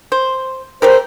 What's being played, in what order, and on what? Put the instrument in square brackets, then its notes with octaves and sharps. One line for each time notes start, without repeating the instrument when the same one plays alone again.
[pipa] C5
[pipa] A3 G4 A#4 [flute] C5